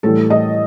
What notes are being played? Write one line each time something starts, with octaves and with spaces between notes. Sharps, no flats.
A2 E3 G3 A4
D#5